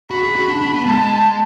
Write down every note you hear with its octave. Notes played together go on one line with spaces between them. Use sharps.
F#4 B5
G#4
F#4
D4
D4
B3
G#3 A5